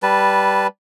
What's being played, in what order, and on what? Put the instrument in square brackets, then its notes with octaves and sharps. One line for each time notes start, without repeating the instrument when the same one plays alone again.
[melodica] G3 B4 A5